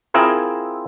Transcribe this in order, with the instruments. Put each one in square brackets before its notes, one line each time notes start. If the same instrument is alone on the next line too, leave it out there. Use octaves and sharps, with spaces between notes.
[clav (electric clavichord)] C4 E4 F4 G#4 A#4